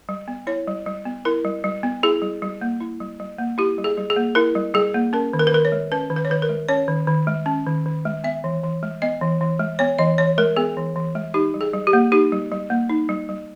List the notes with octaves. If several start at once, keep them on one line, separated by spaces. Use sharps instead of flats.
G3
B3
E4 C#5
G3
G3
B3
E4 A#4
G3
G3
B3
E4 G#4
G3
G3
A#3
E4
G3
G3
A#3
E4 G4
G3
G#4
G3
G#4
A#3
E4 A#4
G3
G3 G#4
A#3
C#4 A#4
D#3
A#4
B4
D#3 A#4
C#5
G#3
C#4 B4
D#3
B4
C#5
D#3 B4
A#4
G#3
C#4 C#5
D#3
D#3
G#3
C#4
D#3
D#3
G#3
B3 E5
E3
E3
G#3
B3 D#5
E3
E3
G#3
B3 C#5
E3 D#5
E3 C#5
G#3 A#4
B3 G#4
E3
E3
G#3
D#4 G4
G3
G#4
G3
G4
A#3
D#4 G4
G3
G3
A#3
D#4
G3
G3